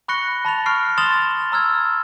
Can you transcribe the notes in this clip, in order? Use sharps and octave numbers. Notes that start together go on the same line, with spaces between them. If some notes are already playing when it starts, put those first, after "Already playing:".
B5 C#6 F#6 A#6 C#7 G7
A5 B5 A6 F7
C#6 F6 F#6 C7 D7
C6 D#6 A6 E7 F7 G7
A#5 E6 F6 G#6